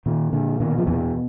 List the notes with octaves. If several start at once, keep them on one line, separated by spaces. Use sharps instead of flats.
A#2 D#3
A#2 D3
B2 D#3
F3
E2 B2 E3